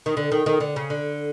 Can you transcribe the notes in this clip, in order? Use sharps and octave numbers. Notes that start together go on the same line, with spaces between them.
D#3
D3
D#3
D#3
D3
C#3
D3